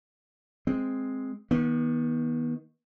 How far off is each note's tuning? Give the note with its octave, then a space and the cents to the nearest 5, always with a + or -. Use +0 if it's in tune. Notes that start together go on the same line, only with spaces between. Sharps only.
G#3 +0 C4 +0
D#3 +20 B3 -35